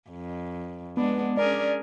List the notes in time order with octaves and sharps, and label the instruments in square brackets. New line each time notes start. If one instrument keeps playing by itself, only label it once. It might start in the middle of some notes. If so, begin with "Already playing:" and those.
[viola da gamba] F2
[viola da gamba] G#3 D4 [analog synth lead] B3
[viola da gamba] C#4 G#4 A#4 [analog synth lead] D5